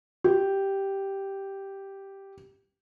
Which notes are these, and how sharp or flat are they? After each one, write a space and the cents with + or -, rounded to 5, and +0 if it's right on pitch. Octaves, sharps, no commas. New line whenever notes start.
G4 -5